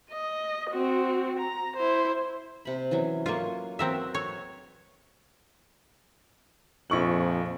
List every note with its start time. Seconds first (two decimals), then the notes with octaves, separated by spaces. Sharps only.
0.11 D#5
0.70 C4 F#4
1.39 A#5
1.77 E4 C5
2.65 C3 B5
2.91 E3 F#3 C#4
3.26 F#3 A#3 F4 G#5 C#6
3.79 C4 F#4 A#4 B4 E5
4.15 C#5
6.90 A#1 F2 C#6 F#7